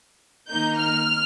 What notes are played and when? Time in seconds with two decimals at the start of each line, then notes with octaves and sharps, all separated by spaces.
0.49 D#3 A#3 D#4 G6
0.79 F6